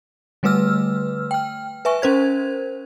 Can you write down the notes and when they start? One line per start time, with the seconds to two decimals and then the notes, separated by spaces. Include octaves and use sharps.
0.43 D3 G3 A3 B4 E6 F6
1.31 G5 F6
1.85 B4 E5 G#5 C#6
2.02 C#4 A#4 C5 G#6